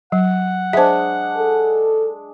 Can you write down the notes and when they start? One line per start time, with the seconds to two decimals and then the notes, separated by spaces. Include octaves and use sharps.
0.12 F#3 F#5
0.73 G#3 D4 C5 E5
1.37 A4